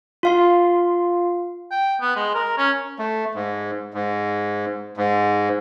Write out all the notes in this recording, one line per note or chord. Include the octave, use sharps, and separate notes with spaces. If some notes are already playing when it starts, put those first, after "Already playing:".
F4 F5 C6
G5
B3
G#3
A#4
C#4
A3
G#2
G#2
G#2